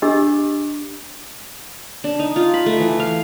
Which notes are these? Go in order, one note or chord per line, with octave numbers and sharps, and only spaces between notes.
D4 G4 D#5 D6 E6
D4
D#4
F4
B5
A3
E3
F5